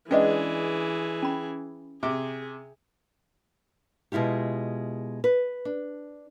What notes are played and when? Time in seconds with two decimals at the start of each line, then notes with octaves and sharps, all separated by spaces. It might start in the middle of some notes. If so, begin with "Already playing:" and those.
0.11 E3 G#3 C#4 D4 G#4 B4 D#5
1.23 C#4 B5
2.03 C3 G#4 D6
4.12 B2 G#3 E4 F4 G4
5.24 B4
5.65 D4